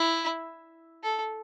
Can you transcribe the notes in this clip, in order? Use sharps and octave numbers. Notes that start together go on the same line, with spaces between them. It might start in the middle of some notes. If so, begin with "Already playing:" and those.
Already playing: E4
A4